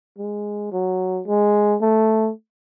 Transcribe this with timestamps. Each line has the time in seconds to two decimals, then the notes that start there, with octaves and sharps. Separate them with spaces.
0.18 G#3
0.72 F#3
1.27 G#3
1.81 A3